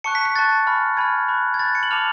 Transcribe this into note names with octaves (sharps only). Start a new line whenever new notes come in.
A5 C#6 F#6 C#7
B6
B6
A5 C#6 F#6 A6
G#5 B5 F6
G#5 B5 F6 G#6
B5 F#6
G#6
B5 F#6 A6
C#7
F#7
A5 D6 F6 F7